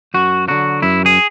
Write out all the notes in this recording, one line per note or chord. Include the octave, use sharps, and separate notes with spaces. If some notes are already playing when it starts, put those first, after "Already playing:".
F#2 F#4
D3 F#3 F#4
F#2 E4
G#4